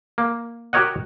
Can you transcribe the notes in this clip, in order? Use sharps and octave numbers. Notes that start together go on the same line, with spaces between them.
A#3
F#4 G4 A#4 C#5 D#5 F#5